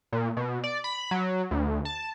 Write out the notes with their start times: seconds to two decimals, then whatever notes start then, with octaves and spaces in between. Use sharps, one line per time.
0.13 A#2
0.37 B2
0.64 D5
0.84 B5
1.11 F#3
1.51 D2
1.85 A5